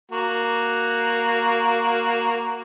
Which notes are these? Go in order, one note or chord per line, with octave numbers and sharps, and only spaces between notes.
A#3 F#4